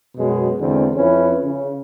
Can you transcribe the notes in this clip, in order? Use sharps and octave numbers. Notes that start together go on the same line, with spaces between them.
F#2 B2 F#3 G#3
E2 D3 G#3 C4
F2 C#4 E4 B4
C#3